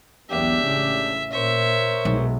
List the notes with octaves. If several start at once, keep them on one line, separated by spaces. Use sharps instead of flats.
B1 E2 G#3 B3 D4 G4 E5
A1 A2 C#3
A#2 A#4 C5 C#5 E5
B1 G#3